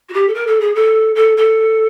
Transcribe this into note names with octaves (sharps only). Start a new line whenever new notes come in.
F#4
G4
A4
A#4
A4
G#4
A4
A4
A4